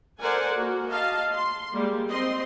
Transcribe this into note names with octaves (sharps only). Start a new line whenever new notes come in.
A4 A#4 C5 D5 F#5 G#5
A#3 F#4
D#5 F5 A5
C6
G3 G#3 A#3
C4 D#5 C6